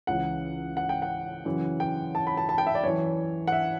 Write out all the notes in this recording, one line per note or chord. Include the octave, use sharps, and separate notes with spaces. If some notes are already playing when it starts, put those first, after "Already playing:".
C#2 C#3 E3 F#5
F#5
G5
F#5
F#2 C#3 E3
G5
A5
B5
A5
A5
G5
E5
D5
F#2 E3 C#5
F#5
E5